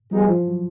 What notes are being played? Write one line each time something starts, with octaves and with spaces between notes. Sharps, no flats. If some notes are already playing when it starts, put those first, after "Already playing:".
F3 G3 B3 D#4 G#4
E3
F3
F#3